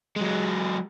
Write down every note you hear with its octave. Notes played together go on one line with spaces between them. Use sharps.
F#3 G#3